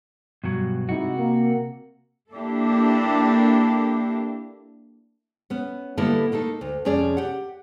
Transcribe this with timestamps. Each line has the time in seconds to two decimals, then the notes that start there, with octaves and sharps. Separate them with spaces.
0.44 G2 B2 F#3
0.89 G#2 C3 D#4 E4 F#4
1.18 A#3
2.33 A#3 D4 E4 G4 A4
5.50 B3 C#4
5.97 D3 G3 A#3 B3 E4 A4
6.32 A3 A#3 D#4 A4
6.61 D2
6.85 F2 C3 C#4 G#4 D5
7.17 G4 F#5